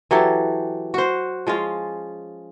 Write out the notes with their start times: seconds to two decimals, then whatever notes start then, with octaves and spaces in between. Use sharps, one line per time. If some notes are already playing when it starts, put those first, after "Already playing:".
0.11 E3 F#3 G4 A4
0.94 F#4 C5
1.47 F3 G#3 C#4 F4